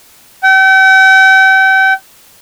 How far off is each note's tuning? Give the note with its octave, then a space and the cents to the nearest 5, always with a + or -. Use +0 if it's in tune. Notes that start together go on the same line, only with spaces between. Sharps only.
G5 -40